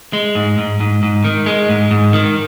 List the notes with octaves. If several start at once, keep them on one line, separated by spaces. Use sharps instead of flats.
G#3
G#2
G#2
G#2
G#2
D#3
G#3
G#2
G#2
D#3